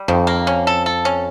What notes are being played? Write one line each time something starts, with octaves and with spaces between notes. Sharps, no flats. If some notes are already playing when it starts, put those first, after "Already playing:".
Already playing: G3
F2 D#3
A#3
C#4
A4
A4
C#4